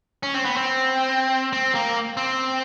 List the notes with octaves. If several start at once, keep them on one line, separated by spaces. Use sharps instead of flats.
C#4
C4
B3
C4
C4
A#3
C4